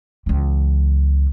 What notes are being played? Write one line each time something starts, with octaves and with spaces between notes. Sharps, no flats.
C#2 E3